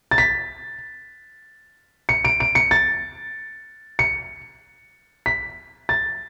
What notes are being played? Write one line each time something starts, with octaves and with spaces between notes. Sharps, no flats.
A6
B6
C#7
D7
D7
C#7
A6
C#7
B6
A6